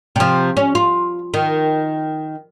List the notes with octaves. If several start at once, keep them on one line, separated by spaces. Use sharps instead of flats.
C3 F3
C#4
F4
D#3